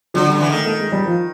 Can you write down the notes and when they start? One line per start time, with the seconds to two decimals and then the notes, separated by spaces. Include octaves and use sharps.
0.14 D3 F#3
0.27 G3
0.32 D3
0.41 E3
0.50 D#3 A3
0.66 A3
0.80 G#3
0.92 G3
1.06 F3